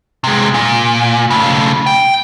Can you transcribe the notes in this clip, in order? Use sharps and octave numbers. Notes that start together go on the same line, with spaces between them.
C3 G#3
A#2
C#3 A3
G5